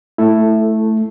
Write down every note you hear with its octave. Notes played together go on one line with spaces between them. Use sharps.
A3 E4 A4